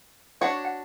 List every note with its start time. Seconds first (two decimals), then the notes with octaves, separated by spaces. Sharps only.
0.41 D4 F#4 C#5 D5 F#5
0.65 F#5